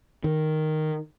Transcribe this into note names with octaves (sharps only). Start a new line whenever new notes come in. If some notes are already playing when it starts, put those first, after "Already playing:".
D#3